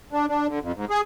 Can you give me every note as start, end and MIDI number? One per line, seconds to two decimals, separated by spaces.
0.13 0.26 62
0.29 0.47 62
0.48 0.59 50
0.62 0.72 41
0.76 0.85 44
0.90 1.01 68